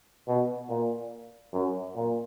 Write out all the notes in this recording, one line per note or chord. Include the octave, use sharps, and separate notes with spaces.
B2
A#2
F#2
A#2